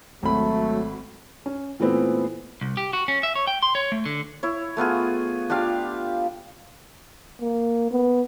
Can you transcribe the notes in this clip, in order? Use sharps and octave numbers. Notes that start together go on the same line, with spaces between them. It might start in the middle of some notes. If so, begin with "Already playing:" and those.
G#1 F#3 A3 B5
C#4
A#2 E3 A3 B3 C4
C2
G4
F#4
C#4
E5
C#5
G5
C6
C#5
A3
D3
E4 C#5
A3 B3 F4 G#4
D4 F4 G4 F5
A#3
B3